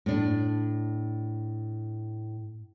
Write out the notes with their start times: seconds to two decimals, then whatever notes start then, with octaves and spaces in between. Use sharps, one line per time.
0.06 A2 D4